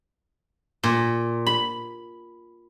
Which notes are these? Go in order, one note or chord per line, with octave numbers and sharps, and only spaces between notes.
A#2
B5